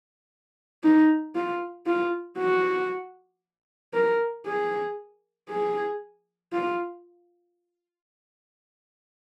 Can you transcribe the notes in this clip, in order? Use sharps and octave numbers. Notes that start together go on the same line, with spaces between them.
D#4
F4
F4
F#4
A#4
G#4
G#4
F4